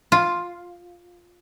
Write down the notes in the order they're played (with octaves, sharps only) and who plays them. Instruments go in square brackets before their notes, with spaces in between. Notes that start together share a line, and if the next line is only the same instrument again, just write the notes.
[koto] F4